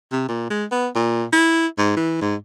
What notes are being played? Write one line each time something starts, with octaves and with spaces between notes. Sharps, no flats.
C3
A#2
G#3
B3
A#2
E4
G#2
E3
G#2